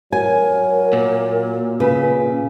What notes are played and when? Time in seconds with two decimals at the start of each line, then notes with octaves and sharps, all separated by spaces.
0.12 F#3 A#4 G#5
0.93 A#2
1.80 C#3 B4